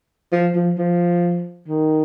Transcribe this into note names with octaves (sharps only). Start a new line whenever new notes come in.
F3
F3
F3
D#3